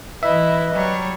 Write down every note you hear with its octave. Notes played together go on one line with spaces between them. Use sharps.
E3 E4 B4 D#5 E5
F#3 G3 C#5